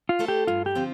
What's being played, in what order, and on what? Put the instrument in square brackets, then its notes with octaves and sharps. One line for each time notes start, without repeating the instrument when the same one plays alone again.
[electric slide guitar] F4
[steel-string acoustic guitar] A3 E4 A4 C5
[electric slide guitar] G4
[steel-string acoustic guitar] G2 [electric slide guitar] F4
[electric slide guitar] G4
[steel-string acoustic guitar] D3 F3 C4 F4